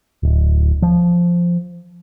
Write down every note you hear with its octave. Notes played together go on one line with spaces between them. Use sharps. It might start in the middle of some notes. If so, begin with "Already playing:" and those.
D1
F3